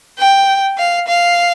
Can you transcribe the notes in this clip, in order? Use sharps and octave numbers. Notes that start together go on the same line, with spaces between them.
G5
F5
F5